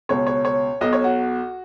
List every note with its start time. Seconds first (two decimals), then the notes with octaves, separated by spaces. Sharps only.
0.09 C#2 B2 C#5
0.27 C#5
0.45 C#5
0.81 B1 B2 D#5
0.93 C#5
1.04 F#4